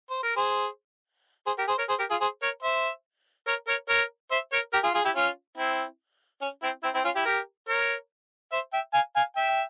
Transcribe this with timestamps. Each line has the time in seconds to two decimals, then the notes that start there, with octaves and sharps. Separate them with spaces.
0.10 C5
0.23 A#4
0.36 G#4 C5
1.47 G#4 C5
1.58 G4 A#4
1.68 G#4 C5
1.78 A#4 C#5
1.89 G#4 C5
1.99 G4 A#4
2.10 F4 G#4
2.21 G#4 C5
2.43 A#4 C#5
2.63 C5 E5
3.47 A#4 C#5
3.68 A#4 C#5
3.89 A#4 C#5
4.31 C5 E5
4.52 A#4 C#5
4.73 G4 A#4
4.83 F4 G#4
4.94 F4 G#4
5.05 E4 G4
5.15 C#4 F4
5.57 C4 E4
6.42 C#4
6.62 C4 E4
6.83 C4 E4
6.94 C4 E4
7.04 C#4 F4
7.15 E4 G4
7.25 G4 A#4
7.68 A#4 C#5
8.52 C5 E5
8.73 E5 G5
8.94 F5 G#5
9.16 F5 G#5
9.36 E5 G5